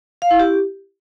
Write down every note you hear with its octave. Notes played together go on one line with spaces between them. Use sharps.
F5
E4
G4